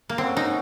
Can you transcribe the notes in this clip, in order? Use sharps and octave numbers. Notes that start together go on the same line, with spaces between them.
A#3
C4 C#4 A4 C#5 F#5
D#4